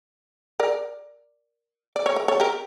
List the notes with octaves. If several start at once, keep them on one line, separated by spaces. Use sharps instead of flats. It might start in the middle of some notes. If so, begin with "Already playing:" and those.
A#4 D5
D5
C#5
A#4
A4 C#5
G4 A#4